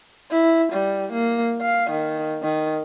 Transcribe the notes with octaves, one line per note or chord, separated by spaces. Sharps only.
E4
G3
A#3
F5
D#3
D#3